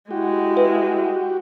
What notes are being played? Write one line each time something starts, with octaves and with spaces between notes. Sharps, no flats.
G#3 E4 F#4 G4
B4